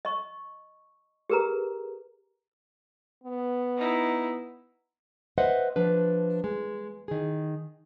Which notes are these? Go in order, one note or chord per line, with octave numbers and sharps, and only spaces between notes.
D#5 C#6
G4 G#4 A#4 B4 A#5
B3
D#4 E4
B4 C5 D#5 E5 F#5
F3 D4 B4
G#3
D#3 G#4